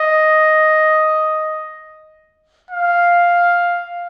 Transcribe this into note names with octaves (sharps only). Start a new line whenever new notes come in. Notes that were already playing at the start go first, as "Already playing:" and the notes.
Already playing: D#5
F5